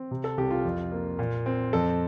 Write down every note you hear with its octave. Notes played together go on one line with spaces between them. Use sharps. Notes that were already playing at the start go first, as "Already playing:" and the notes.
Already playing: C4
C3
A4
C2 G4
F4
F2
A#3
A#2
C4
F2 A4